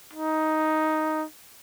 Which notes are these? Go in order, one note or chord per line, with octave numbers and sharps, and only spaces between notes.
D#4